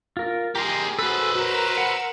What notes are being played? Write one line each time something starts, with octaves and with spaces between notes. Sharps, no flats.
F4 A#4
G4 G#4 A#4 A#5 C6
F#4 A4 B4 C5
F#4 A#4 A#5 E6
F#5